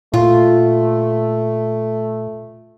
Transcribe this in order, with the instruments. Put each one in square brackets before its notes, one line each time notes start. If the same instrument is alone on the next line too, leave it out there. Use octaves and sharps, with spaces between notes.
[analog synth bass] A#2 [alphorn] A3 [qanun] F4